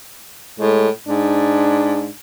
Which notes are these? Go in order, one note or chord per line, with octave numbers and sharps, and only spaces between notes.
A2 G#3
G#2 D4